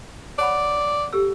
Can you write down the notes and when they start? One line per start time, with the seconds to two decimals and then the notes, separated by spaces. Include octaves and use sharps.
0.39 C#5 D5 F#5 B5
1.13 G4 A4 E6